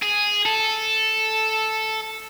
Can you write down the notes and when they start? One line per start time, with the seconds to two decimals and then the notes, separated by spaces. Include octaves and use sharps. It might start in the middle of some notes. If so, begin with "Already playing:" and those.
0.03 G#4
0.46 A4